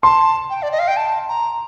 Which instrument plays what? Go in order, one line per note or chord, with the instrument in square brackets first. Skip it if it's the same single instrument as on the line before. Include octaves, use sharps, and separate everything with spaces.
[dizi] A5 [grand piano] C6
[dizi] G5
D5
D#5
F5
G5
A5
A#5